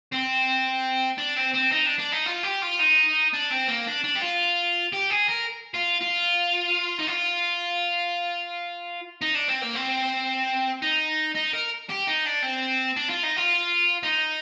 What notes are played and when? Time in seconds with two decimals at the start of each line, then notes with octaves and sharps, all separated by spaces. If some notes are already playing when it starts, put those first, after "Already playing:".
0.12 C4
1.18 D4
1.36 C4
1.54 C4
1.72 D#4
1.85 D4
1.99 D4
2.12 D#4
2.26 F4
2.43 G4
2.62 F4
2.79 D#4
3.33 D4
3.50 C4
3.68 A#3
3.87 D4
4.04 D4
4.15 G4
4.21 F4
4.93 G4
5.11 G#4
5.29 A#4
5.74 F4
6.01 F4
6.99 D#4
7.07 F4
9.21 D#4
9.35 D4
9.48 C4
9.62 A#3
9.75 C4
10.82 D#4
11.35 D#4
11.53 A#4
11.89 G4
12.07 D#4
12.25 D4
12.42 C4
12.96 D4
13.09 F4
13.23 D#4
13.36 F4
14.03 D#4